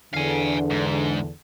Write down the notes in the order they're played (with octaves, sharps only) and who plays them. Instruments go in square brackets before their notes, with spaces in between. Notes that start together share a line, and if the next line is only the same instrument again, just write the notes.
[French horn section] E2 D3 [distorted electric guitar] F5 G#5
[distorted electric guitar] G#2